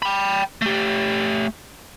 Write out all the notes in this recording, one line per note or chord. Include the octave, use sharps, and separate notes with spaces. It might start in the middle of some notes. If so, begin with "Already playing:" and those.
G5 B5
A3 G4